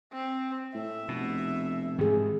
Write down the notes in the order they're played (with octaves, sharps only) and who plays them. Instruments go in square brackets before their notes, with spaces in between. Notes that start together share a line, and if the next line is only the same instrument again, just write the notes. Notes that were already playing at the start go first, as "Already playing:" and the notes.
[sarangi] C4
[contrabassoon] A2 [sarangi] E5
[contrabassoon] F1 [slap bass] B2
[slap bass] G#2 D#3 E3 [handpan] C4 G#4